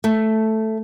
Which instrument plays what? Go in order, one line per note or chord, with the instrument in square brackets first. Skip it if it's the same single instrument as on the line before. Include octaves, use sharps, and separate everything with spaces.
[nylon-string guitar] A3